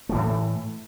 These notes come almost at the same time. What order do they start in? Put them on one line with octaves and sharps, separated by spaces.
A3 E3 A2